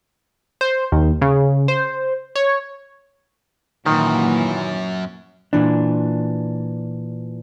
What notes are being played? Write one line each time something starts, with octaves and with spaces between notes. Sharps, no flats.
C5
D#2
C#3
C5
C#5
F#2 A#2 D#3 E3
A#2 E3 D4